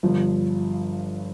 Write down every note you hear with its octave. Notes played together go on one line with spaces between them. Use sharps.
G1 G2 F3